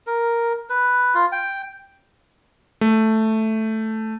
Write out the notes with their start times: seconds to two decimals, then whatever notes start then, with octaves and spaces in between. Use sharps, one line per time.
0.07 A#4
0.70 B4
1.14 F4
1.32 G5
2.81 A3